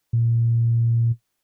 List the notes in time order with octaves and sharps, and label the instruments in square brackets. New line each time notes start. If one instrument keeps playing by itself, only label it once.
[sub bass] A#2